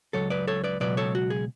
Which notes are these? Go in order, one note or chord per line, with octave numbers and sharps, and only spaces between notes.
C#2 B2 F#3 A4 C#5
B4 D5
A4 C#5
B4 D5
C#2 B2 F#3 B4 D5
A4 C#5
F#4
G#4